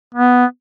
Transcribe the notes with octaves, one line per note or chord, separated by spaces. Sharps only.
B3